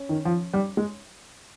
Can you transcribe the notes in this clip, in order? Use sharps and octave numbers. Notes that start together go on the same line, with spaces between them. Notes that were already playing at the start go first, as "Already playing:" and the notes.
Already playing: C#4
D#3
F3
G3
G#3